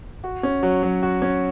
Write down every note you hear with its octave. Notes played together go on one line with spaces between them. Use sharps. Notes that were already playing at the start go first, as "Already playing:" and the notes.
F#4
C#4
F#3
F#3
F#4
C#4